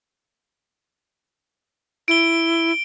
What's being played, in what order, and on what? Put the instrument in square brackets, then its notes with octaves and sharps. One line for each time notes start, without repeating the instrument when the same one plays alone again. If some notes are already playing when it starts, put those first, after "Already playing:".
[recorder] E4 [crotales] D7 G7